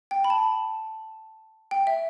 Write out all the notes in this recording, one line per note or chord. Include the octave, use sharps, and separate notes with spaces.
G5
B5
A5
G5
E5